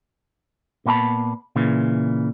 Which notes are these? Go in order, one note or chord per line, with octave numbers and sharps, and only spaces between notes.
A#2 B3 F#4 A5 B5
A#2 C#3 E3